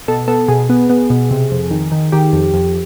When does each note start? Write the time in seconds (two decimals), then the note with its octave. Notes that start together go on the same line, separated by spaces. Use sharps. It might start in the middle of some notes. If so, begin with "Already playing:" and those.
0.08 B2 A4
0.28 B3 A4
0.48 B2 G#4
0.70 B3
0.90 B3
1.10 B2
1.31 C3
1.51 F2
1.71 D#3
1.92 D#3
2.12 D#3 G4
2.33 F2
2.54 F2